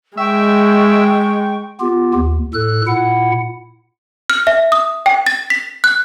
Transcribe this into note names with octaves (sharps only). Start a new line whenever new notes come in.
G#3 E5 G5 C#6
B3 F4 G4
D#2
A2 A4 F#6
A#2 E4 F#5
F6
E5
D#6
G5
A6
B6
F#6